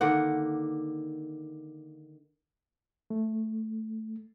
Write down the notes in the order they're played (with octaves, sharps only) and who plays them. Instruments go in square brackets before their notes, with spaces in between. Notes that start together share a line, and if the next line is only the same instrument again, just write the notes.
[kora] D3 D#3 A#3 F#5
[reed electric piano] A3